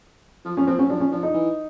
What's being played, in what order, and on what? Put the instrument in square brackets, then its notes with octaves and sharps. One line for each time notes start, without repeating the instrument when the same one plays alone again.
[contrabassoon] F3
[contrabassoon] F3 [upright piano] C#4
[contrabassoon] F3 [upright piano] C4
[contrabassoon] F#3 [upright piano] C#4
[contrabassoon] F3 [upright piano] D4
[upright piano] C#4
[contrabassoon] F3 [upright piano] D4
[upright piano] D#4
[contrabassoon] E3